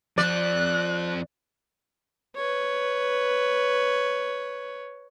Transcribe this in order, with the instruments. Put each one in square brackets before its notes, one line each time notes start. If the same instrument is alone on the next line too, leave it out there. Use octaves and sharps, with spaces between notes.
[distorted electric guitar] F2 C4 [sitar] D5 [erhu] F#6
[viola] B4 C#5